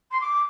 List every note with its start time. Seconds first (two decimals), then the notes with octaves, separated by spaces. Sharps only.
0.11 C6
0.20 D6